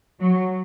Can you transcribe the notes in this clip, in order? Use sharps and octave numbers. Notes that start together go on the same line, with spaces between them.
F#3